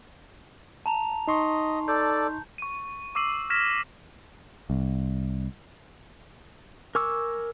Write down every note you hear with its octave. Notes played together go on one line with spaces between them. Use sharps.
A5 A#5 F7
D#4 D#5 C6 C#6
A4 D5 G6
C#6 D#7
C#6 D6 E6 C7 D#7 F#7
C#6 F6 G#6 A#6 B6 E7
C2
A#4 G#5 C#6 D6 E6